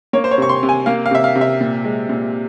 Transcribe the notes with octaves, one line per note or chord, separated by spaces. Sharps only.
A#3 C#5
C5
C#5
C3 C#6
C6
C3
G#5
A#3 F5
F5
C3 E5
F5
C3
E5
A#2
G#3
A#2